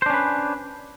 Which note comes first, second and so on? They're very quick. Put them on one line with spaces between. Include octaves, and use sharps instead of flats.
C5 D4 C#4 B4